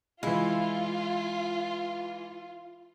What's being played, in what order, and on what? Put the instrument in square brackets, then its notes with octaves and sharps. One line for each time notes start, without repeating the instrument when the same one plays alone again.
[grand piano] E3 G#3 [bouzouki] E4 [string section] F4